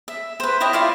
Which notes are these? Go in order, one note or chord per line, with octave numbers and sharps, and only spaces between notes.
E5
B4 C5
E4 C#5 D#5 G5
E4 F4 D5 F5